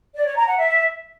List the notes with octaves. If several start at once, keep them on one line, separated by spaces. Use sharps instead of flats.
D5
C#5
A#5
F#5
E5